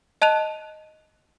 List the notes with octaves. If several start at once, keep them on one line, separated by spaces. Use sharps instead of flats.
D#5 A5 F#6 D#7 F7